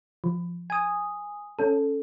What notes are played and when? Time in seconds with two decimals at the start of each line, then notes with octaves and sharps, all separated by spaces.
0.24 F3
0.70 G#5 D#6
1.59 C#4 A4